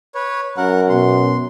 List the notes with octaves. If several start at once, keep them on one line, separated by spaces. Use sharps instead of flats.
B4 C#5
F#2 A#4 F#5
B2 C6